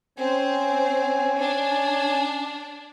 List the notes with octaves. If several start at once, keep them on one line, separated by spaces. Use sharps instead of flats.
C4 C#4 C5 G#5
D4